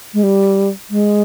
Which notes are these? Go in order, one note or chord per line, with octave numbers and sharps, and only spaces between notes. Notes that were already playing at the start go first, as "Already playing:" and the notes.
G#3
G3
G#3